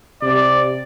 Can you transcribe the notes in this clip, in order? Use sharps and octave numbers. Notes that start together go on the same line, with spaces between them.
C3 D5